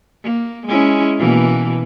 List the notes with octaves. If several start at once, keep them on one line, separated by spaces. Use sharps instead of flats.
A#3
G#3 C#4 E4
B2 E3 A#3